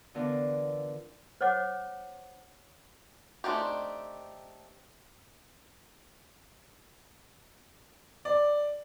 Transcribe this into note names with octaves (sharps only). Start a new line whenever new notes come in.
D3 E3 B3 F4 A#4 D5
C5 C#5 F#5 D6
A3 C4 D4 D#4 G4
D5